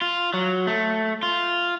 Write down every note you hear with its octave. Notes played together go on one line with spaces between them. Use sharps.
F4
F#3
A3
F4